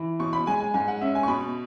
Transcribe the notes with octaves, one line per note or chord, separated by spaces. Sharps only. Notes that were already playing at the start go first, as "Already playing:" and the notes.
Already playing: E3
B2 C#6
B5
G#3 G#5
G#5
G#2 G#5
F#5
C#4 E5
G#5
C#6
B2 B5